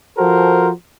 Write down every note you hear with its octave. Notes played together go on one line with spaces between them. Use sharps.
F3 F#4 A4 A#4 C5